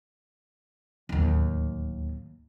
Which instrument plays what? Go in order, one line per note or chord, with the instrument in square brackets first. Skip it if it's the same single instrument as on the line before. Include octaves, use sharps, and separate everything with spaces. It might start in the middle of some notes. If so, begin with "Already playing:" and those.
[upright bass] D1 D#2